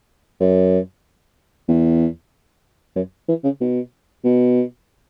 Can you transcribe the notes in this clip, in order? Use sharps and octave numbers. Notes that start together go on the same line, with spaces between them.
F#2
E2
F#2
E3
C#3
B2
B2